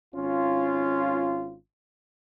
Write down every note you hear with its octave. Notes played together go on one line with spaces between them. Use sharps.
G#1 C#4 F4